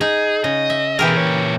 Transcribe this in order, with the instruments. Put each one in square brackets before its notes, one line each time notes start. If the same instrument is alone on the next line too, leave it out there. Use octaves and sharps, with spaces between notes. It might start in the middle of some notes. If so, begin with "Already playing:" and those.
[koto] D#4 [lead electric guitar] G#4
[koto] C#3 [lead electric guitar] D#5
[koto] E5
[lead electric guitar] B2 G#4 [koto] E3 G4 A#4
[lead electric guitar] A#2 C#5